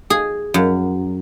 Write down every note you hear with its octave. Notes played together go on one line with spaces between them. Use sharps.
G#4
F#2